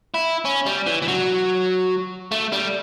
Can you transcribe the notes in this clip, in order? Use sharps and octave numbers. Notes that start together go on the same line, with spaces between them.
E4
C#4
G3
E3
E3
F#3
A3
G3